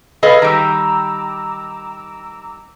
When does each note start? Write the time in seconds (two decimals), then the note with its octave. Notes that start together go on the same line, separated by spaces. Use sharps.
0.23 G#4 A4 B4 D#5 F5 B5
0.42 D#3 G3 A#5 D6 E6